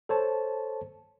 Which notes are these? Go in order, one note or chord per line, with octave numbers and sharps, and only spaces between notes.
A4 C5 C#5 A5